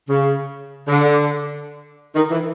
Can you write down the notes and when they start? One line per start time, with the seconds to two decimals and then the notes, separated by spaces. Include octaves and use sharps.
0.08 C#3
0.88 D3
2.15 D#3
2.31 E3